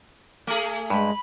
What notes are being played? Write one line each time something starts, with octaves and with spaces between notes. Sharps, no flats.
A3 G#4
G2 G#3 B5